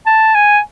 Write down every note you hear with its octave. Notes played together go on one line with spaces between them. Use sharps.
A5
G#5